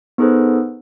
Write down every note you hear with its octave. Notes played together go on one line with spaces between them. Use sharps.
B3 D#4 G#4 A4 B4 C5